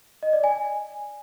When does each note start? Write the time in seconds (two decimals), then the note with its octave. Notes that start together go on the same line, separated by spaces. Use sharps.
0.23 D#5
0.33 D5
0.44 G#5